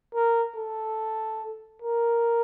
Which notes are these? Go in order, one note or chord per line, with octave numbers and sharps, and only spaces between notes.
A#4
A4
A#4